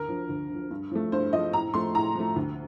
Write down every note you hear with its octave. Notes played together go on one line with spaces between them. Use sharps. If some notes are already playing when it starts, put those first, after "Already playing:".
Already playing: D2 A#4
D3 F3
D2
D3
F3
G2
F3 A3
G2 C5
F3 A3 D#5
A2 A#5
F3 A3 C6
A2 A#5
F3 A3
D2